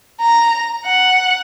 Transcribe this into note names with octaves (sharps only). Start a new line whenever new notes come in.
A#5
F#5